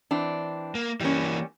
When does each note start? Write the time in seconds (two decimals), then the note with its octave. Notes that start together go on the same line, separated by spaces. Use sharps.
0.11 E3 C4 D4
0.75 A#3
1.00 E3 G3 A#3 C#4